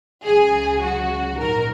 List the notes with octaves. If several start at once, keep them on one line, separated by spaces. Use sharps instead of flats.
C#2 C#3 F#3 G#4
F#4
A#1 G#2 D#3 F#3 A#4